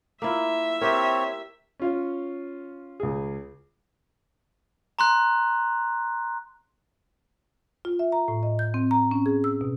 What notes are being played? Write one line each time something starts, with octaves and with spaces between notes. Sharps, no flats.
A#3 E4 F4 E5
C4 G4 A#4 C#5
C#4 F4 C#5
C#2 G#4
A#5 C6 F#6
F4
E5
A#5
A2
D#5
G6
C4
A#5
C#4
G#4
E6
B2